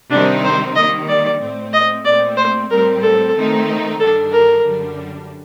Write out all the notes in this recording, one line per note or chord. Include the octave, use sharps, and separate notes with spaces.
C3 D#3 G3 C4 D4 D#4
C5
D#3 G3 A#3 D#5
D5
A2 A3 C4
D#5
A#2 A3 C4 D5
C5
A2 G3 C4 A#4
A4
D#3 A3 C4 D#4
G2 D#3 G3 D4 A4
A#4
F#2 D3 G3 D4